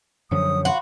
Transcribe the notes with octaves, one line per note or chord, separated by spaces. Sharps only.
F#2 D3 F3 C#5 D#6
F#4 F5 F#5 B5 C6